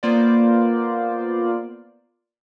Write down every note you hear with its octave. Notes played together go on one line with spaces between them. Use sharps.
A#3 B3 F4 C5 D5